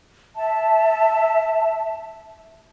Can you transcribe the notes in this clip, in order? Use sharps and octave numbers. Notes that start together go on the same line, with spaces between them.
E5 A5